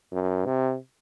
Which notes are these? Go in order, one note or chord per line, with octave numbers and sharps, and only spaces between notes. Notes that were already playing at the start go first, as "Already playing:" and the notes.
F#2
C3